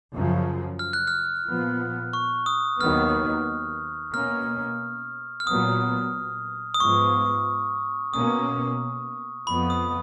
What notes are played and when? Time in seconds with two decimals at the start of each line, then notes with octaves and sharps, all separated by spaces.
0.13 F#2 C#3 F3
0.79 F6
0.93 F#6
1.07 F6
1.46 A#2 F3 B3
2.13 C#6
2.46 D#6
2.80 D#2 D#3 F#3 B3 F6
4.14 B2 A#3 C#4 F6
5.40 F6
5.47 A#2 F#3 B3 D#6
6.74 D#6
6.80 G#2 F3 G#3 B3 C#6
8.13 B2 A#3 C#4 D#6
9.47 F2 F3 B3 B5
9.70 D#6